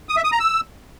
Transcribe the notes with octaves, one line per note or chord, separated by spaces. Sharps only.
D#6
E5
D#6
A#5
E6